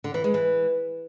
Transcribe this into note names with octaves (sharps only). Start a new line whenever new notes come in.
D3
E3
G#3
E3